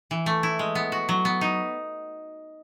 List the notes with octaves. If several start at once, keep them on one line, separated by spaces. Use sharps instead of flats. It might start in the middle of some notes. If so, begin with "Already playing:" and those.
E3
A3
E4
G#3
B3
F#4
F#3
B3
D#4